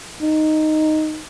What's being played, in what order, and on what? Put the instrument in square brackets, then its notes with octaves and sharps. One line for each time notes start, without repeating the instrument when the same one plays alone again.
[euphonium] D#4